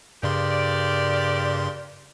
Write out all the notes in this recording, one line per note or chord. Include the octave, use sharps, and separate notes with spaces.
G2 C#3 G4 A#4 D5 C6